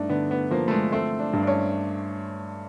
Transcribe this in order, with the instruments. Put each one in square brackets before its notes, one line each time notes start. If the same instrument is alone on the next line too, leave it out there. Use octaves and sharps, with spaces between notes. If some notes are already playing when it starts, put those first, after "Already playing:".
Already playing: [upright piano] G2 A3 [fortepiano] D4 D#4
[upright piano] D3 [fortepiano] B3
[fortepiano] B3
[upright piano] F3 [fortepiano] A#3
[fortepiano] A3
G#3
[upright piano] A3 [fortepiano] C4
[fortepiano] D4
[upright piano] G2
[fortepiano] D4
C#4